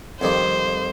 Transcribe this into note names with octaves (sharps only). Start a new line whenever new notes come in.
F2 D#3 G3 C5